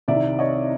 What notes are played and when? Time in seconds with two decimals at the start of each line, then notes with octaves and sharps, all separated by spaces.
0.08 C2 C3 D#3 D5 E5
0.39 C#5 D#5